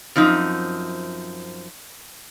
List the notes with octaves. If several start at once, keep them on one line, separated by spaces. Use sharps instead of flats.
F#2 F3 C4 D#4